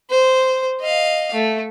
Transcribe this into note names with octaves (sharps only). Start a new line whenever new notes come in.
C5
D#5 F5
A3